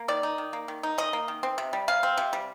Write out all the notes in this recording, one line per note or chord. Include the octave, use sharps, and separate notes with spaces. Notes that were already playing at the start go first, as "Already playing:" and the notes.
Already playing: A#3
D#3 D5
D#4
D#3
A#3
D#3
D#4
D#3 D#5
A#3
D#3
C4
C3
G3
C3 F5
C4
C3
G3